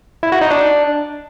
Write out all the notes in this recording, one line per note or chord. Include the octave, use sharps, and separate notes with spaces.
E4
F#4
D#4
D4